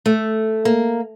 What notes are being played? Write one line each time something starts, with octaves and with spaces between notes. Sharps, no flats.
A3
A#3